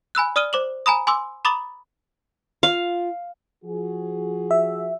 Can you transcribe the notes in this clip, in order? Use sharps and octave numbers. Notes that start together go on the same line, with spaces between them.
G#5 B5 E6 F#6
D5 D#6 F6 D#7 G7
C5 D6 E7 F#7
G#5 A#5 B5 D#6
G#5 C6 D6 E6
A#5 B5 D6 D#6 A6 F#7
F4 F5
F3 F#4 G#4
E5